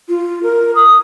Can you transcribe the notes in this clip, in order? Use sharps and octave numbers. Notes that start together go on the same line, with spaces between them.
F4
A#4
D#6